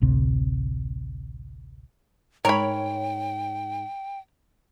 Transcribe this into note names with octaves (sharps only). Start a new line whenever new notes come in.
A1 D2 C3
G#2 A#4 C#5 G5 B5